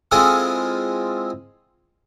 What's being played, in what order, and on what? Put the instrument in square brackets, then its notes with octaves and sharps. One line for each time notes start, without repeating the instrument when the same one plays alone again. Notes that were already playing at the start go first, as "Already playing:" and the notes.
[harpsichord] G#3 C4 E4 F4 G#4 A4